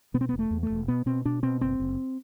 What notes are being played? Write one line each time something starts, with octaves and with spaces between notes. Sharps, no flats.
B2 B3
C4
B3
E1
A3
E2
A3
E1
B2 B3
B2 C4
B2 D4
B2 C4
F#1 C4
F#1